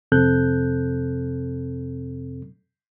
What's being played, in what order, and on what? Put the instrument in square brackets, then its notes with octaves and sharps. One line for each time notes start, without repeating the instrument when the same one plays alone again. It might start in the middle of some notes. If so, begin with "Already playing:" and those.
[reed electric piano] F2 C3 C4 A4 F#6 G6